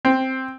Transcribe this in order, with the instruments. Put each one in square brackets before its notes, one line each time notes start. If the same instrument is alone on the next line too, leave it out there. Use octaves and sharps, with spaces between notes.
[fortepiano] C4